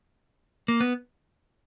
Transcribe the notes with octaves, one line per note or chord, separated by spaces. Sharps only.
A#3
B3